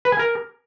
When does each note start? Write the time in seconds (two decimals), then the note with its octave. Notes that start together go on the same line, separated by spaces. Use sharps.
0.05 B4
0.12 G#5
0.19 A#4